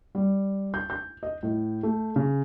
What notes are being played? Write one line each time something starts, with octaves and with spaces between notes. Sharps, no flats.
G3
G6
G6
D#5
A2
A3
C#3